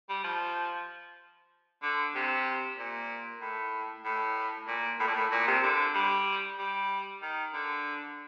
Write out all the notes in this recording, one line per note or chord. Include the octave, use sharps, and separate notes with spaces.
G3
F3
D3
C3
A#2
A2
A2
A#2
A2
A#2
A2
A#2
C3
D3
G3
G3
D#3
D3